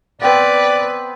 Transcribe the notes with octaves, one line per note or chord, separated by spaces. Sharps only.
B3 C4 B4 D5 G5